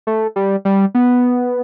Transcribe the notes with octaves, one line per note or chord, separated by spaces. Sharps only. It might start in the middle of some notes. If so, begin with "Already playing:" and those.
A3
G3
G3
B3